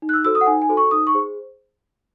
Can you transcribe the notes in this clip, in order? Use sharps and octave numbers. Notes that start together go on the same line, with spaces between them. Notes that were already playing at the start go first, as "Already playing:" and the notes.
D#4
F#6
E6
F#4 A4 C5 E6
D#6
F#5
D#4 G#5
G#5
F#4 A4 C5
C#6
D#4 D#6
C#6
G#4 C5